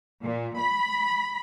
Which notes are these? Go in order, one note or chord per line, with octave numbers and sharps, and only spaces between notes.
A#2
B5